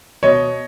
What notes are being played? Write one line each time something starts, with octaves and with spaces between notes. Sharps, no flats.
B2 C#5 D#5